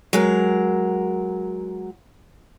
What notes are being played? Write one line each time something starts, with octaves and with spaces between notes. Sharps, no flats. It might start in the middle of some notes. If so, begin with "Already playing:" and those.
F#3 G#3 A#4